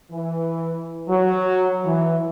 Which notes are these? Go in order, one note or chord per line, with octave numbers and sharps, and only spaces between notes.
E3
F#3
E3